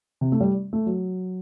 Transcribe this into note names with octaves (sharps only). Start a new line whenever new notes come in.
C3
A3
G3
A3
F#3